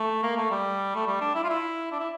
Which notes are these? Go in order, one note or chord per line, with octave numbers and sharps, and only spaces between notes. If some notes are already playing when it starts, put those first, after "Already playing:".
Already playing: A3
A#3
A3
G3
A3
G3
D4
E4
F4
E4
D4
E4